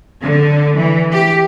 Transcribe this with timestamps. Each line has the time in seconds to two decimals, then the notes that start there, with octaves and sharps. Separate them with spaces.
0.22 D3
0.74 E3
1.11 G4